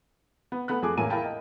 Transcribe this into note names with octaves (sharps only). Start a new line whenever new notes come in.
B3
A3 B3 B5 F#6
F2 A3 G#4 D6
A1 A#3 A#4 C#5 G#5 D#7
E4 A#4 F5 G5 A5 B5
D#5 G5